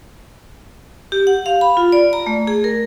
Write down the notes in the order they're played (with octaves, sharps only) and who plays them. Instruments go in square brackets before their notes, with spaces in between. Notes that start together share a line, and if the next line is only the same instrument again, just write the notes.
[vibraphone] G4
F#5
F5
B5
F4
D5
A#5
A3
G#4
A#4